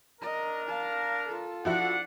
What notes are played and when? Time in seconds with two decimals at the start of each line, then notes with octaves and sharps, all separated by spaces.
0.22 D4 A#4 D#5
0.67 F5 A5
1.27 F4 A4
1.65 F3 D4 E4 F#4 F#5